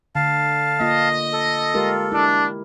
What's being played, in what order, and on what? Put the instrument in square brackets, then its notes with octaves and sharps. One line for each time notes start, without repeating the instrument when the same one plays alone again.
[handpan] D3 [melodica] F5 A5
[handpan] A#3 F4 [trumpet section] D#5
[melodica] A4
[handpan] G#3 G4 A#4 [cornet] F4
[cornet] D4 [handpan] E4